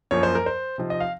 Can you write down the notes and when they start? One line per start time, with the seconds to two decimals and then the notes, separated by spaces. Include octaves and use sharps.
0.11 F#2 F3 A#3 C#5
0.23 C5
0.35 A#4
0.46 C5
0.78 C3 F3 C4 D#4
0.90 D#5
1.00 F5